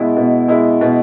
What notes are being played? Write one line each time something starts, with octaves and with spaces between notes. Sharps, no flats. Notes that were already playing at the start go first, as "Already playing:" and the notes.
Already playing: B2 G#3 E4
B2
G#3 E4
B2